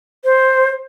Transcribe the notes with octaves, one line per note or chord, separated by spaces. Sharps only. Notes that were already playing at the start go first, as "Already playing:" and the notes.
C5